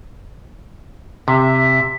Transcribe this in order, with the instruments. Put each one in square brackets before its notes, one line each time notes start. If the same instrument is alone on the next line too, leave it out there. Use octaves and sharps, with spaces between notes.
[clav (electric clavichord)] C3 [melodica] E5